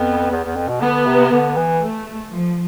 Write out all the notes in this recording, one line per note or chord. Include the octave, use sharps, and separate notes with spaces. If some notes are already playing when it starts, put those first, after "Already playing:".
Already playing: F2 B3
E2
E2
F2
B2
D3 B3
C3
D3
E3
A3
F3